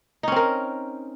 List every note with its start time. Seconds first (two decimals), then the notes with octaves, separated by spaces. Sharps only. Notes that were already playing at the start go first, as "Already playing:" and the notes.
0.23 D#4
0.28 C#4
0.32 C4
0.36 A#4